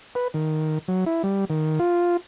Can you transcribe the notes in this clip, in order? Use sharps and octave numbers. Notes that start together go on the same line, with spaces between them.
B4
D#3
F#3
E4
G3
D#3
F4